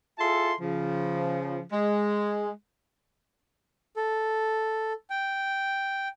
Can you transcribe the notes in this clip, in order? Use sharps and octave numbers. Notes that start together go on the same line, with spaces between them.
E4 F4 G#4 A4 A5 C6
C#3 F3
G#3
A4
G5